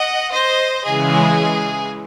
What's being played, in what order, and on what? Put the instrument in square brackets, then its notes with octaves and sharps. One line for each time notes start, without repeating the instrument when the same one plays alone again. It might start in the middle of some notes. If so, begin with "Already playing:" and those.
Already playing: [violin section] D#5 F#5
C5 D#5
[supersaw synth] C#3 E3 G#3 [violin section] G#4